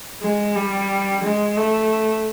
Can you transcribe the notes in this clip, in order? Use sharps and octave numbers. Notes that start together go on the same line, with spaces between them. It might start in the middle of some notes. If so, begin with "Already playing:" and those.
G#3
G3
G#3
A3